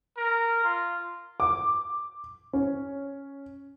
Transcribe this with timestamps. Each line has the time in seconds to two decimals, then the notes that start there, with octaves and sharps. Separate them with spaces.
0.18 A#4
0.64 F4
1.40 D6
2.53 C#4